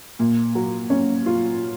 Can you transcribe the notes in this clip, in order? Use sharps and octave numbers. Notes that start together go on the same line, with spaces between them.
A#2
F#3
C#4
F4